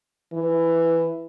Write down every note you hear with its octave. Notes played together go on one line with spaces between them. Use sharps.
E3